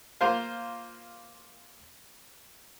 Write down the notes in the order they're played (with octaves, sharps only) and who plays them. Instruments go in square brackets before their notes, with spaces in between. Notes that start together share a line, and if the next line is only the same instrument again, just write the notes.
[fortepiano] A#3 F4 C5 F5